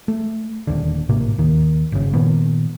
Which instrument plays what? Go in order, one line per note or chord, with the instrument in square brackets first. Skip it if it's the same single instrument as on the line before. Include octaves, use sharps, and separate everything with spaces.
[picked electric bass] A3
D#1 D#2 D3
G#1 A2 C3 A#3
D#2 D#3
G1 C#3
A#2 D#3 B3